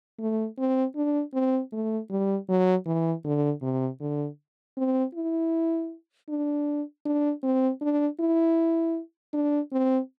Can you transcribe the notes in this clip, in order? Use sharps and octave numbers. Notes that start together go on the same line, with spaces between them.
A3
C4
D4
C4
A3
G3
F#3
E3
D3
C3
D3
C4
E4
D4
D4
C4
D4
E4
D4
C4